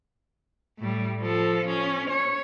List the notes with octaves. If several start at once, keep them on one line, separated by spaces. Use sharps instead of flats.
A2 G3
F3 A4
C#4
C#5